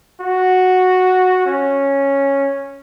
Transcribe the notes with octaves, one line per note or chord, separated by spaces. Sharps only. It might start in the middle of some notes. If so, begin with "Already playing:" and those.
F#4
C#4